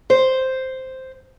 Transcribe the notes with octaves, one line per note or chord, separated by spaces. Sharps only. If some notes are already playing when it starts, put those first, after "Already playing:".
C5